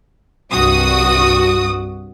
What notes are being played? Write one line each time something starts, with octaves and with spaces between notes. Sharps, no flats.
C2 G2 F#4 D#6